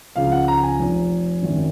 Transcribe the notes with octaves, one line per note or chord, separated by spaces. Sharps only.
C#2 C#3 F3 F5
F#5
A#5
G#5
F1 F2 F3
G#1 F#2 D#3